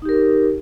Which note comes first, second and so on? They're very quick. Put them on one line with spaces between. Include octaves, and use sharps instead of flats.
D#4 G4 A#4